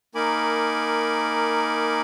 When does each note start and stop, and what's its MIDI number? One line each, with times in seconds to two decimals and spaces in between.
0.15 2.02 58
0.15 2.02 63
0.15 2.02 70
0.15 2.02 80
0.15 2.02 83
0.15 2.02 86